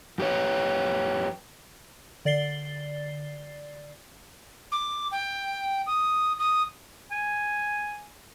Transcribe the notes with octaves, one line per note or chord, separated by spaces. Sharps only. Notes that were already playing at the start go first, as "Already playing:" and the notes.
F#2 G4 B4 C#5
D3 D5 A6 C7 G7
D6
G5
D#6
D#6
G#5